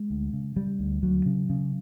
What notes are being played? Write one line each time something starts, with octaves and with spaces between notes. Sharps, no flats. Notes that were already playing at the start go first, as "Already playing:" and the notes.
Already playing: G#3
D2
C#3
C#3 G3
D2
D2 F#3
C#3
C#3